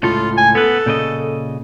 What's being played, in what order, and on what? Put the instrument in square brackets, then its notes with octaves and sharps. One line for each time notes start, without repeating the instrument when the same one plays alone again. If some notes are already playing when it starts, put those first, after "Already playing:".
[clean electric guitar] C#2 A2 A4 [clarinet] F4
[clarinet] G#5
[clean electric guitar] B3 B4 [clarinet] A4
[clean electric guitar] A#2 C#3 D#5